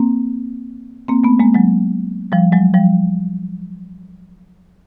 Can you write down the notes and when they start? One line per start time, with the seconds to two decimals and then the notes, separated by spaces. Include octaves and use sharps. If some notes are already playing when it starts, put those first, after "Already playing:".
Already playing: A#3 C4
1.08 A#3 C4
1.24 A3 B3
1.40 G#3 A#3
1.55 F#3 G#3
2.32 F3 G3
2.52 F#3 G#3
2.74 F3 G3